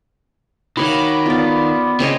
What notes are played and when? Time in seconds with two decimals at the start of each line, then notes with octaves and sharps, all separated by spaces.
0.77 D#3 F#4 C#5 F5 B5 D6
1.26 B3 F4 D5
2.00 C#3 C4 C#5 D#5